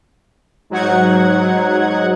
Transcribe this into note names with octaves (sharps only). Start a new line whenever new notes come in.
G#2 F#3 D#4 F#5 G#6